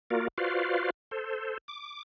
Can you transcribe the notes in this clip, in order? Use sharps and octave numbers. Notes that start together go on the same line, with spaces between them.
A#3 F4 F#4 A#4 D5
F4 F#4 B4 C5 D5 F5
A4 C5
D6